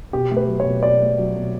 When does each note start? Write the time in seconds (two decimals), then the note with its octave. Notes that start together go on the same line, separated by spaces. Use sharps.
0.13 B2 G4
0.31 A3
0.37 B4
0.48 F#3
0.60 C#5
0.65 B2
0.83 B2 D5
1.00 A3
1.18 F#3
1.36 B2